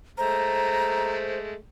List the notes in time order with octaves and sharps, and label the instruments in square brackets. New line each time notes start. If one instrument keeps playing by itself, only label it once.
[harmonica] G#3 A3 [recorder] C5 [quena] A#5